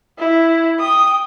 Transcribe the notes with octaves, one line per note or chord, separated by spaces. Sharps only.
E4
G5 D#6